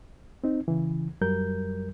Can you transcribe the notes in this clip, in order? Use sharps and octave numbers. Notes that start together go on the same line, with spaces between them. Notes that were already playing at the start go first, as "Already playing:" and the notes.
C4 D#4
C#3 E3
F#2 F#3 G3 A#4 G6